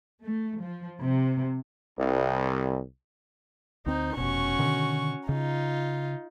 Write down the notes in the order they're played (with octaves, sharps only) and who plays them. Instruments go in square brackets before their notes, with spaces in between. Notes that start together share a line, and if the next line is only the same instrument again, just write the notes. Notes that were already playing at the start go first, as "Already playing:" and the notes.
[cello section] A3
F3
C3
[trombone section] C2
[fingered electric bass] D2 C4 [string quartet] D#4 C5
[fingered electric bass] F1 B2 [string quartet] C#4 F#4 C#6
[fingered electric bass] B2 D3 D#3
[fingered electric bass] C#3 [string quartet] D#4 F4